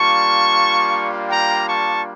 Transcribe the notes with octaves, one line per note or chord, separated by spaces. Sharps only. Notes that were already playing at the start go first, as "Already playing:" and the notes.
Already playing: G3 A#3 D4 F4 A5 C#6
G5 A#5
A5 C#6